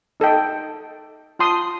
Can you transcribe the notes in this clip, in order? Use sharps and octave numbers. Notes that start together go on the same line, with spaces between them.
D#4 A4 D#5 G5
F4 A5 C6 D#6